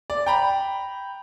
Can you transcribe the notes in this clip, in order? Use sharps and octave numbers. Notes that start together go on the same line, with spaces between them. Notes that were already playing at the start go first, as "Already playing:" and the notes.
D5
G5 A#5 B5